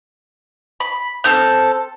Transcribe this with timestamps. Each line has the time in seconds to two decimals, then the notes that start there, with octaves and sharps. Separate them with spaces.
0.80 B5
1.24 C4 A4 F6 G6